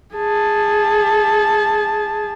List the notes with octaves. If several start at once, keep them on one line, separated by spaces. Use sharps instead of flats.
G#4 A5